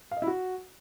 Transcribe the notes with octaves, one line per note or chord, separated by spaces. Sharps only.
F5
D#5
E4
F#4